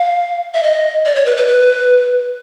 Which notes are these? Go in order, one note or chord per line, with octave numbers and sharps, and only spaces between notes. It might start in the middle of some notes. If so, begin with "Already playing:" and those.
Already playing: F5
E5
D#5
D5
C#5
B4
B4
B4